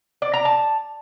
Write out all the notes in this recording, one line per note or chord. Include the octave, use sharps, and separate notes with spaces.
D5
A#5
A5